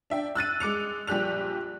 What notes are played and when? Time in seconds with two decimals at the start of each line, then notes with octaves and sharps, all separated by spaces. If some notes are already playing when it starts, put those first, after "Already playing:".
0.10 D4 E5 G5
0.35 E6 F#6 A6 D#7
0.60 G#3 D6 C#7 F7
1.07 A#1 G3 G4 F#6 F7